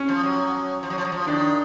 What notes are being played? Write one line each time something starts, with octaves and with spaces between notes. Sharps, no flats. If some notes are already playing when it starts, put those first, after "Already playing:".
Already playing: C#4
F3
F#3
F3
F#3
F3
F#3
F3
D#3 D4